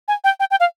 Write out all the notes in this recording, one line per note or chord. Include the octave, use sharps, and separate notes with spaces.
G#5
G5
G5
G5
F5